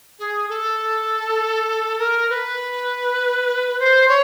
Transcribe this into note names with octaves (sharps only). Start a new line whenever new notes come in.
G#4
A4
A#4
B4
C5
C#5